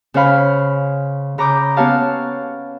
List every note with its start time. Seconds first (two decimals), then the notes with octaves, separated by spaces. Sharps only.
0.14 C#3 C#4 C5 F5 B5
1.38 C#3 A#5 B5 D6 D#6 G6
1.76 B3 C#4 G4 C#5 F5 A5